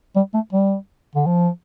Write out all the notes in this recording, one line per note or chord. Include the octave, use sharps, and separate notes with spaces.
G3
A3
G3
D3
F3